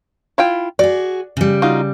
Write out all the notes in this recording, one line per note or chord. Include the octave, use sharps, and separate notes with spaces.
E4 F4 G5
F#4 G#4 D5
C#3 G3
D#4 F4 F#4